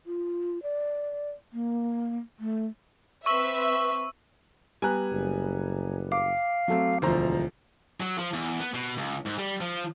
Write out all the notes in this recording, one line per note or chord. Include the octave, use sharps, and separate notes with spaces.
F4
D5
A#3
A3
C4 B4 E5 C#6 E6
G3 B3 G#5 A#5 F#6
F#1
F5 D6
F#3 A3 C4
E1 D2 F3 C5 A#5
F#3
F3
E2
B3
B2
C#2
G#2
G3
F3